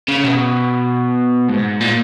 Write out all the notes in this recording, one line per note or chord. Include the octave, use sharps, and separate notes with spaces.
C#3
B2
G#2
A#2